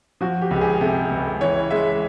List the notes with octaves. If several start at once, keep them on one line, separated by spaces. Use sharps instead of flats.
F3 F#4
G4
C#2
G4
G#4
C3 A4
C#2
E3 C#5
G#3 E5